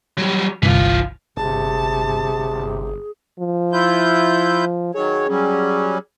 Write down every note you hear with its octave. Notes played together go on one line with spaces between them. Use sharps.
F#3 G3
G1 C2 E3 F4
G1 C3 G#4 A5
F3
E4 F4 G6
D#3 F#3 G#4 C#5
F#3 G3 C#4